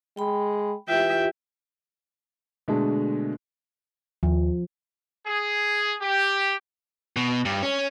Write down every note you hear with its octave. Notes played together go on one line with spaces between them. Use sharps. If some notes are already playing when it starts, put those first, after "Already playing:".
G#3 G5 B5
E3 F4 G4 E5 G5
B2 D3 G#3 A3 D4 G#4
D#2 F3
G#4
G4
B2
G2
C#4